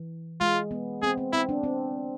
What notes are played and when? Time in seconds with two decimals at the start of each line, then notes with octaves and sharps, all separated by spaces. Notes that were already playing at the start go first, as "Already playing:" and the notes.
Already playing: E3
0.41 G#3 F4
0.71 B3
1.02 C4 G#4
1.18 C4
1.33 C4 E4
1.49 D4
1.63 C4